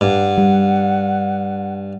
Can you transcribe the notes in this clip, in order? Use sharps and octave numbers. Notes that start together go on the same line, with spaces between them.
G2 F#5
G3